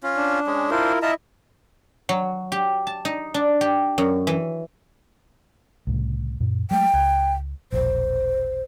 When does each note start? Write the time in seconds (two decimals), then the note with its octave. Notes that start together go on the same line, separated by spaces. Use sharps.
0.03 C#4 F4
0.16 D4
0.47 G#3 C#4
0.71 D4 E4 F4 A#4 C5
1.02 E4 F4 D#5 E5 A5 A#5
2.09 F#3
2.52 G4
2.87 A5
3.05 D#4
3.34 D4
3.61 G4
3.98 F#2
4.27 E3
5.87 C2 A2 C#3
6.40 F#2 A#2
6.71 F#3 G#3 A3 G5
6.93 C#2
7.73 E1 A#1 C5